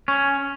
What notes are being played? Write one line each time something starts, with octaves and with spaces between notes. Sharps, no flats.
C#4